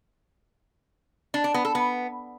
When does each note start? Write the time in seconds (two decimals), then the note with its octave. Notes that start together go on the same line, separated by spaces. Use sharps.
1.34 D4
1.44 D4
1.54 B3
1.65 A4
1.75 B3